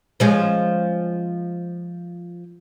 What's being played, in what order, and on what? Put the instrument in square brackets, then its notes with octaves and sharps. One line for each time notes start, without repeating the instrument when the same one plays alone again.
[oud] F3 G#3 C#4